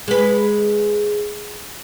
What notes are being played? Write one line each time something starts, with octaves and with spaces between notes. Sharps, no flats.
G#3 B4